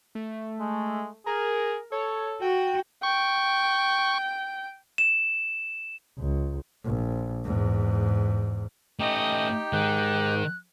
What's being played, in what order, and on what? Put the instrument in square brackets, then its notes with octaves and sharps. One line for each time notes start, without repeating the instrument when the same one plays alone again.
[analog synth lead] A3
[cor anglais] G#3
[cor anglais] G#4 [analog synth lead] A#4
[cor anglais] A4 [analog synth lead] C#5
[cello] F#4 [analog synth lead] G5
[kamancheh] G5 [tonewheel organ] C#6
[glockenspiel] E7
[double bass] C#2
A#1
E2 G#2
[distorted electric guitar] A3 C#4 [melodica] D#4 G4 G5 [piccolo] D#5
[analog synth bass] G#2 [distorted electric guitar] D#3 [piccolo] F#6